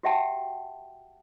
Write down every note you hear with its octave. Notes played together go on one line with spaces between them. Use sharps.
F#4 G4 E5 F#5 G5 A5